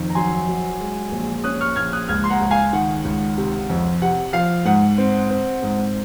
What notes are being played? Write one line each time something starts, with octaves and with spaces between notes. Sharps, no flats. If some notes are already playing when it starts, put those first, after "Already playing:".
Already playing: F2 D#3
A#5
F#3 G#5 C6
F#3
G#3
A#1
C#4 D#6 F#6
C#6 F6
A#1 F6 G#6
D#6 F#6
C#2 F6 G#6
C6
F#5 A#5
C#2
F5 G#5
D#3 F#5
C#2
C3
F2
C3 F#5
F3 F5
G#2 F#5
C4
C4
G#2